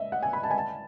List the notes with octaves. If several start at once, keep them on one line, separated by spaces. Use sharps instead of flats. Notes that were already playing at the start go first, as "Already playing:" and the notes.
Already playing: D#5 E5
F#5
G#5
B5
A5
G#5
A5